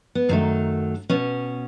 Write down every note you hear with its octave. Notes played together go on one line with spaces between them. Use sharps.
B3
F#2 D#3 F#3 A3 C4
B2 B3 C#4